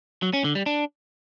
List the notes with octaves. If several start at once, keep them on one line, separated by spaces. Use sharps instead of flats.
F#3
C#4
D3
G3
D4